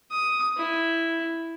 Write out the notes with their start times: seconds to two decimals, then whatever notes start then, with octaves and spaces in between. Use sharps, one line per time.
0.11 D#6
0.57 E4